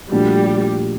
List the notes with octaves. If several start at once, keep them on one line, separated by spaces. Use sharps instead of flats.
A#2 F3 G3 A3 D4 F#4